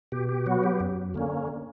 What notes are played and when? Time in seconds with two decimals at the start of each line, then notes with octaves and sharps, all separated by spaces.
0.12 B2 G4
0.29 G4
0.46 F#3 B3 F#4
0.63 G4
0.80 F#2
1.14 D3 A#3 C#4